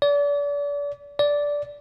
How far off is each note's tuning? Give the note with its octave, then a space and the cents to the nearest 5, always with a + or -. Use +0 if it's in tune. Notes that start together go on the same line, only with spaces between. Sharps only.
D5 -35
D5 -10